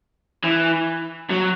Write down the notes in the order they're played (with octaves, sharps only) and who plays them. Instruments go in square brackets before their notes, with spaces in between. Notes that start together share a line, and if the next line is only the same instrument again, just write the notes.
[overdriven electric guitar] E3
F#3